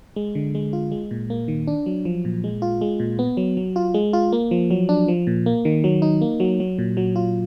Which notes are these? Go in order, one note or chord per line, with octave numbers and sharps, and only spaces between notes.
G#3
D3
G#3
F4
G#3
A#2
A#3
D#3
D4
F#3
F3
A#2
G#3
F4
G#3
A#2
B3
F#3
F#3
F4
G#3
F4
A#3
F3
F#3
D4
F3
A#2
A#3
D#3
F#3
D#4
A#3
F#3
F#3
A#2
F#3
F4